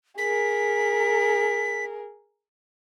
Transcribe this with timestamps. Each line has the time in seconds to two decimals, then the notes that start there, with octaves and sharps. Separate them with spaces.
0.18 G#4 A#4 B6